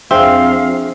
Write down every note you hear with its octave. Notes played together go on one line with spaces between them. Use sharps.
F2 F3 C4 D4 G#4 E5 F5